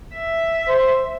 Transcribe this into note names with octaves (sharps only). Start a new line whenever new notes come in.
E5
C5